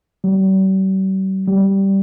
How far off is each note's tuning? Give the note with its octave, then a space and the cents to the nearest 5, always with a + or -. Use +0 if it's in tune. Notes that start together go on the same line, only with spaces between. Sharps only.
G3 -45
G3 -10